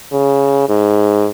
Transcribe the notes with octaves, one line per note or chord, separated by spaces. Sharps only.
C#3
G#2